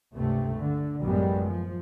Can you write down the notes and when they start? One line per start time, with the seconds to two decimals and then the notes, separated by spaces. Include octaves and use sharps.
0.13 C#2 G2 C3 A3
0.56 D3
1.01 A1 F#2 G3 G#3 B3
1.45 F3